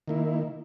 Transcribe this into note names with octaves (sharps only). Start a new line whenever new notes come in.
D#3 A#3 E4